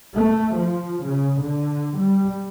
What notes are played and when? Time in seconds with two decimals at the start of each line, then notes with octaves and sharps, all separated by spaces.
0.16 A3
0.56 F3
1.04 C#3
1.41 D3
1.98 G3